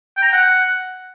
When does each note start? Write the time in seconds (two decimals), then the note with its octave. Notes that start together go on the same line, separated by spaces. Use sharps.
0.17 G5
0.22 A#5
0.28 G5
0.33 F#5